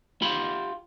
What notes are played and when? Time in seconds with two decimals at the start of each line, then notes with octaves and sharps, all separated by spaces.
0.22 F4 G4 B5